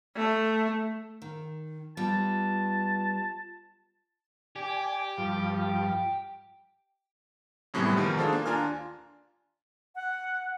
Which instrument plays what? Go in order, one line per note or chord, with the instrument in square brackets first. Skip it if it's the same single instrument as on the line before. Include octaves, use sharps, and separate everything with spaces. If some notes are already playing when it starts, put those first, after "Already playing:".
[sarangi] A3
[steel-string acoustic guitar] D#3
[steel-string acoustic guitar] G3 B3 [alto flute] F4 [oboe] A5
[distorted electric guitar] G4 [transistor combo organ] D5 G#5
[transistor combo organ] G2 F3
[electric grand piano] F#2 A2 C3 E3 G3 B3
G#2 B2 D#3 F3
D4 F4 G#4 A4 C5
A#3
D#2 D4 F4 G#5 A#5 F6
[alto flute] F#5